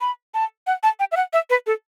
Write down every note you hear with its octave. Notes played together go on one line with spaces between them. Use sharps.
B5
A5
F#5
A5
G5
E5
F#5
E5
B4
A4